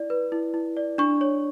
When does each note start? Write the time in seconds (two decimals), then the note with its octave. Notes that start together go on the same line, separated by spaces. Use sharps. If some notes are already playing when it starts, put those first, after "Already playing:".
Already playing: E4 D5
0.10 B4
0.32 E4
0.54 E4
0.77 D5
0.98 D4 C#6
1.21 C#5